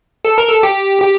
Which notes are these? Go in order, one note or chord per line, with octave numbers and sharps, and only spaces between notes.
A4
A#4
A4
G4
G4